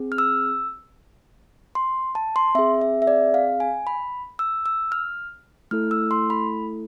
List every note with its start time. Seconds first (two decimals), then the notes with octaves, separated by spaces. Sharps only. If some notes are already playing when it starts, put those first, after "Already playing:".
Already playing: C4 G#4
0.12 F6
0.18 E6
1.75 C6
2.15 A5
2.36 C6
2.55 C4 E5
2.59 G#4
2.81 E5
3.02 E5
3.07 D5
3.34 F5
3.60 G#5
3.87 B5
4.39 E6
4.66 E6
4.92 F6
5.71 A3 E4 A4 F6
5.91 E6
6.11 C6
6.30 B5